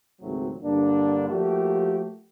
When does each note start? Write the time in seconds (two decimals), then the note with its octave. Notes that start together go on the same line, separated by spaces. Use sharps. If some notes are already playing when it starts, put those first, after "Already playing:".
0.21 G#1 C#2 F#3 A3 C4
0.63 G2 D3 A#3 D4
1.29 F3 A3 A#3 F#4 G4